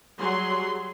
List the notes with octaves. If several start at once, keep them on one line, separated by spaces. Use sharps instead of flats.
F#3 G3 G#4 C6